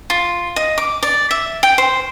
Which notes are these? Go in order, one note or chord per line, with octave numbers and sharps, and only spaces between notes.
F4
D#5
D6
D5
E5
G5
C5